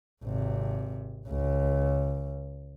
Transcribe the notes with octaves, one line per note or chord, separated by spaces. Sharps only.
G#1 C3
C#2